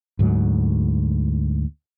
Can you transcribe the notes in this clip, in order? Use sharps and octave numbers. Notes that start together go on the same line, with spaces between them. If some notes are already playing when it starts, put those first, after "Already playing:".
D2 G#2 F#3